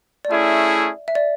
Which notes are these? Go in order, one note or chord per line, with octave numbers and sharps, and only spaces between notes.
D5
A3 C#4 E4 G#4 E5
E5
D5